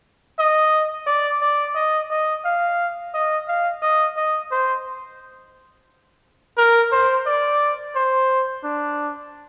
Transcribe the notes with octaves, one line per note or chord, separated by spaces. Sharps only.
D#5
D5
D5
D#5
D#5
F5
D#5
F5
D#5
D#5
C5
A#4
C5
D5
C5
D4